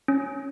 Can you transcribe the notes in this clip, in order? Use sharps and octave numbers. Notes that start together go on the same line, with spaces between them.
C#4